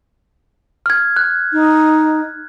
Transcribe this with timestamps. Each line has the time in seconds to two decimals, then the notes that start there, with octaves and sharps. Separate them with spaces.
0.86 F6 G#6
1.17 F#6
1.53 D#4